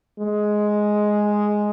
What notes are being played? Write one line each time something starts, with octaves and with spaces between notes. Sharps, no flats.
G#3